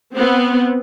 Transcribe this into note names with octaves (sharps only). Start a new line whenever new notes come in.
B3 C4